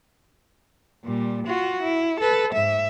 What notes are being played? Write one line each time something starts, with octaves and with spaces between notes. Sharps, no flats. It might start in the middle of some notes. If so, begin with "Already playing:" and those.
A#2 G3
F4 F#4
E4
A4 B4
G#2 E5